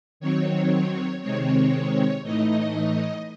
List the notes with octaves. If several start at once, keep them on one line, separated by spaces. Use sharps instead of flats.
D#3 F#3 C4 C#5
C3 D#3 G#3 C4 C#5
A2 E3 A3 D#4 D#5